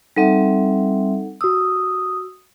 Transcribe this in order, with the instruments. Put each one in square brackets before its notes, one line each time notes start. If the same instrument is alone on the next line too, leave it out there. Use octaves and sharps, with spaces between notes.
[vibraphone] G3 C4 E5 [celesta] D#4 A4 F#5
[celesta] F#4 E6 [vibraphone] D#6